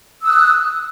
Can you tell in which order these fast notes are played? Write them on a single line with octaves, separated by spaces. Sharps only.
E6 D#6 F#6